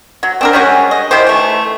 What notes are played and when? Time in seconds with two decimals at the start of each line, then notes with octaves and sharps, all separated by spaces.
0.23 F#3
0.41 C4 D4 A#4
0.53 G3 G#3 C#4 F#4
0.91 D#5
1.11 D#3 E4 G4 C5
1.27 E3 A3